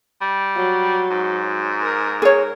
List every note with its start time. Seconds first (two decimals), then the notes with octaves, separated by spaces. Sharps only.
0.21 G3
0.57 F#3
1.11 G#2
1.82 A#4
2.22 G#4 A#4 C#5